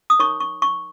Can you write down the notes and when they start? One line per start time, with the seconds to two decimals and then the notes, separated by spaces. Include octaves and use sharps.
0.10 D#6
0.19 D#4 A#4 C#5 C#6
0.40 C#6
0.62 C#6